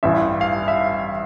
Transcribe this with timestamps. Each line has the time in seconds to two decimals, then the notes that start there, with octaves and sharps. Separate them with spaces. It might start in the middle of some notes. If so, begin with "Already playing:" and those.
0.03 A1 G2 E3 E5
0.41 F5
0.68 E5